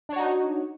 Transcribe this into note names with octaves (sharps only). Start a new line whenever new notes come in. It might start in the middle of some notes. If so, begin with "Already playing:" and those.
D4 D#4 F#4 C#5